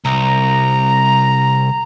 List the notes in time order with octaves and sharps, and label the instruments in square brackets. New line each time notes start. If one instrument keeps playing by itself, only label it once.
[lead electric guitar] C2 [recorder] A#5